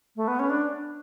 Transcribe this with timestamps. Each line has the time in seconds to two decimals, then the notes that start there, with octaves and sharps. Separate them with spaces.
0.16 A3
0.28 B3
0.39 C#4
0.50 D4